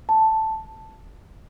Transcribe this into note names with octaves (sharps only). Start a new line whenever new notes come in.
A5